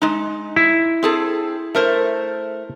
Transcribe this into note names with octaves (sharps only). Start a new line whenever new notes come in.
G#3 D#4
E4
C4 G#4 A4
A3 A#4 C5